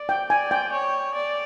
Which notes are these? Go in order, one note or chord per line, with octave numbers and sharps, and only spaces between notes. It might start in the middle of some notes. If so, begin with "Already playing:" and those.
Already playing: D5
G5
D5 G#5
G5
C#5
D5